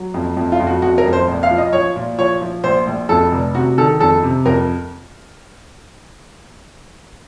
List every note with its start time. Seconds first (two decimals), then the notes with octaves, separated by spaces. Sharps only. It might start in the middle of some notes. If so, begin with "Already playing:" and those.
Already playing: F#3
0.14 F2
0.37 F2
0.52 F4
0.60 F2
0.67 F#4
0.82 F2 F#4
0.98 A#4
1.06 F2
1.13 C5
1.28 A#1
1.43 F5
1.51 F3
1.58 D#5
1.73 F3 C#5
1.96 A#2
2.18 F3 C#5
2.41 F3
2.64 A#1 C5
2.87 A#1
3.09 F2 A4
3.32 F1
3.55 C3 F#4
3.78 D#3 A4
4.00 F2 A4
4.23 C3
4.45 F2 A#4